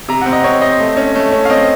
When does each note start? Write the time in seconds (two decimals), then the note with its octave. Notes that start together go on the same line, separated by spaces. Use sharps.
0.09 C3 A#5
0.21 F#5
0.26 C4
0.33 D#5
0.44 C4 C#5
0.61 C4 D#5
0.80 A3
0.97 C#4
1.15 A3
1.32 C#4
1.45 F5
1.50 C4 D#5